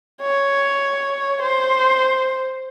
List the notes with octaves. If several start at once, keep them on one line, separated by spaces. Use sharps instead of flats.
C#5
C5